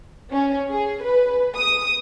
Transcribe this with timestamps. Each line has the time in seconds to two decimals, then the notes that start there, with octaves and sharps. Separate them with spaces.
0.32 C#4
0.71 G#4
1.03 B4
1.56 D#6